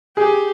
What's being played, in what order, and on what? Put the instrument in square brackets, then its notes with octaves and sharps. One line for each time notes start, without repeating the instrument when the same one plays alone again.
[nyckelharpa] G4 [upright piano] G#4